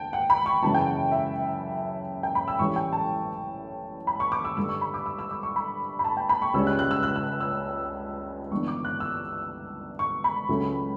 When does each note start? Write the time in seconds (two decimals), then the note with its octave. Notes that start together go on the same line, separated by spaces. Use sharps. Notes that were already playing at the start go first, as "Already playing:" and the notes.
Already playing: D2 F#5 G5 A5
0.13 F#5
0.30 B5
0.46 C#6
0.62 F#2 C#3 E3 A5
0.74 G5
0.87 F#5
1.12 E5
2.23 G5
2.35 B5
2.48 E6
2.59 A1 A2 G3 C#4 C#6
2.76 G5
2.93 A5
4.07 B5
4.20 C#6
4.32 D6
4.45 E6
4.57 G2 D3 G3 E6
4.69 C#6
4.81 B5
4.94 D6
5.06 E6
5.19 E6
5.31 D6
5.43 C#6
5.56 B5
5.99 B5
6.04 A5
6.17 G5
6.29 B5
6.42 C#6
6.54 C#2 C#3 G3 C#4 E6
6.67 F#6
6.79 F#6
6.91 E6
7.03 F#6
7.16 E6
7.40 E6
8.51 G1 G2 E3 B3 D4 C#6
8.68 D6
8.85 F#6
9.00 E6
9.99 C#6
10.24 B5
10.49 C#2 C#3 F#3 A3 C#4